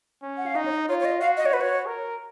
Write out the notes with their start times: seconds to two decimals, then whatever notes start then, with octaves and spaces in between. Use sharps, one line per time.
0.23 C#4
0.37 F#5
0.46 F5
0.56 D#4 D#5
0.66 C#5
0.71 D#5
0.89 F4 C#5
1.00 C#5
1.05 D#5
1.21 F#4 F5
1.37 D#5
1.46 C#5
1.53 F#4 B4
1.61 C#5
1.87 A#4